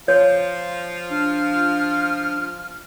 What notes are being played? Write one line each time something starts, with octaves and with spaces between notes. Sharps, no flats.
F3 F4 C#5
D4 F6